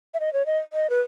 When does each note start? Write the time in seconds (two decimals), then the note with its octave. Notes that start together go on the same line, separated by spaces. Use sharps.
0.14 E5
0.20 D#5
0.33 C#5
0.46 D#5
0.73 D#5
0.90 B4